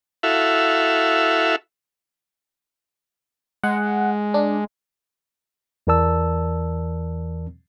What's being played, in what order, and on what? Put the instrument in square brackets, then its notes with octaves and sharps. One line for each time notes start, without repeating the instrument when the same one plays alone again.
[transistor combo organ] E4 F#4 A4 E5 F5
[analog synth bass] G#3 [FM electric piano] F#5
[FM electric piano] D4
[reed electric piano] E2 E3 A#4 D5 A5 E6